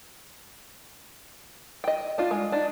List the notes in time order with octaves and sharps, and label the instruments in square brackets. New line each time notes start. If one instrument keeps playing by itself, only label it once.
[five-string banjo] D#5 G5
D4 F4
G#3
D4 D#4